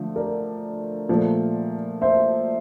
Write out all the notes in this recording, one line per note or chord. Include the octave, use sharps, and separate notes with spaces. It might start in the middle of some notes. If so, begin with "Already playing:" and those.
Already playing: D3 F3 A3
A#4 D5
A#2 F3 A3
C5 E5